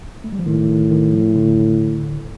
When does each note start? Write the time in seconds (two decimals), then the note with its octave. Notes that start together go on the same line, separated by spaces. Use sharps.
0.24 A3
0.32 G3
0.39 F3
0.46 A2 D#3
0.69 D#3
0.91 D#3
1.13 F3
1.36 D3